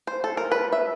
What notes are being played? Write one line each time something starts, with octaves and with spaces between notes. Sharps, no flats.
C5
A4
A#4
B4
E5